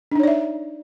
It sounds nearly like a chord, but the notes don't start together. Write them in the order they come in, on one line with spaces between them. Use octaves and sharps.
D4 D#4 C#5 D5 E5